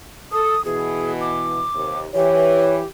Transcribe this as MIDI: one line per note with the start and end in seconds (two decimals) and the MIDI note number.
0.32 0.55 69
0.32 0.64 87
0.65 1.62 47
0.65 1.62 52
0.65 1.13 68
1.21 2.00 86
1.74 2.06 39
1.74 2.06 48
2.15 2.82 52
2.15 2.87 67
2.15 2.77 73